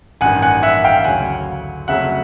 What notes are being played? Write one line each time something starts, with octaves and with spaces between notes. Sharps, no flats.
A1 G2 D#3 F#5 G#5
F#5 G#5
E5 F#5
F5 G5
D2 C#3 F#3 F#5 G#5
F2 C#3 F#3 A3 E5 F#5